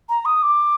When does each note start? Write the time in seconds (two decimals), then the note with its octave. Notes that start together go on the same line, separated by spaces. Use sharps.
0.09 A#5
0.25 D#6
0.42 D6